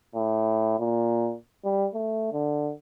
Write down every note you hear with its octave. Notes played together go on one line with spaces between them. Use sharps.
A2
A#2
G3
A3
D3